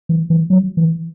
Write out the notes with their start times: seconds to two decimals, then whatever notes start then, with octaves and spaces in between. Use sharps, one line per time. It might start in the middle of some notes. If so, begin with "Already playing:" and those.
0.09 E3
0.30 E3
0.50 F#3
0.77 E3